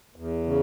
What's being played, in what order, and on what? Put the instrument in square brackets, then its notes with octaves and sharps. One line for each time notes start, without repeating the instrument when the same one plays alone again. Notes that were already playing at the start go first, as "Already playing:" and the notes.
[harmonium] E2
C#3